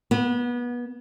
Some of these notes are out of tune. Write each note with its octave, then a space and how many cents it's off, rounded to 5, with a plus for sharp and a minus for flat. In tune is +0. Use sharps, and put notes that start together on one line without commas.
B3 -25